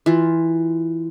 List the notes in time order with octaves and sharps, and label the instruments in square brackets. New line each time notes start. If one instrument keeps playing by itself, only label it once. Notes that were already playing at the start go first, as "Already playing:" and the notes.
[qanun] E3 F4